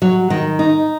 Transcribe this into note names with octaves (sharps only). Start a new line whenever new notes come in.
F#3
D#3
D#4